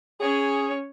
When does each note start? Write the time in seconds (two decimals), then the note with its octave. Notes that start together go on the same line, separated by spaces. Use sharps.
0.21 C#4 G#4 C#5